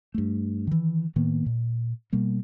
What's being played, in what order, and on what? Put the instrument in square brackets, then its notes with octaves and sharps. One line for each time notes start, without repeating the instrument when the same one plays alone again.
[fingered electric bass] G2 A3
D#3 E3
A2 D#3 A#3 B3
A#2
B2 G3 A#3